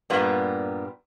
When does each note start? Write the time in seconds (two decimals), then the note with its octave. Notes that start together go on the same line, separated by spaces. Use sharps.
0.10 G2 A#2 G3 A#3 B3